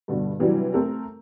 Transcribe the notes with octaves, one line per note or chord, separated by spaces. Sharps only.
G2 B2 D3
C3 E3 F#3 G3 D4
A3 C4 A4 A#4